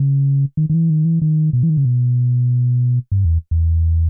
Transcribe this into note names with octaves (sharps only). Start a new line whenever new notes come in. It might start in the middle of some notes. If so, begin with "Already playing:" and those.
Already playing: C#3
D#3
D#3
E3
D#3
E3
D#3
B2
E3
D#3
C#3
B2
G2
E2
E2